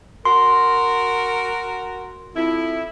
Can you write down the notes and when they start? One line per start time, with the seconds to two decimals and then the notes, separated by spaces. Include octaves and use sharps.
0.25 F#4 A#4 C6
2.35 F2 E4